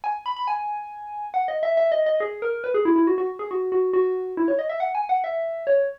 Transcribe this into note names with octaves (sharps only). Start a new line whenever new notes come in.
G#5
B5
B5
G#5
F#5
D#5
E5
E5
D#5
D#5
G#4
A#4
B4
G#4
E4
E4
F#4
F#4
G#4
F#4
F#4
F#4
E4
C#5
D#5
E5
F#5
G#5
F#5
E5
C#5